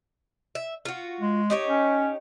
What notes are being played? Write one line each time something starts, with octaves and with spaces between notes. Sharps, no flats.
E5
F4 F#4
G#3
D#4 G4 C#5
C#4